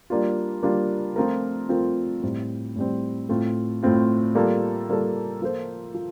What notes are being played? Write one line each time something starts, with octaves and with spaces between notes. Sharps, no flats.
G3 A#3 D4 F4
G3 A#3 D4 F4
F3 A3 C4 F4 A#4
F3 A3 C4 F4 A#4
A2 G3 C4
A2 G3 C4
A2 A3 C4 F4
A2 A3 C4 F4
G3 A#3 F4 A4
G3 A#3 F4 A4
F3 A#3 F4 A4 C5
F3